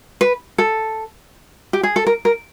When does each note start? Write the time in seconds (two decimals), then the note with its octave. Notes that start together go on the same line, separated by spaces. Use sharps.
0.21 B4
0.58 A4
1.73 G4
1.83 G#4
1.96 A4
2.07 A#4
2.25 A#4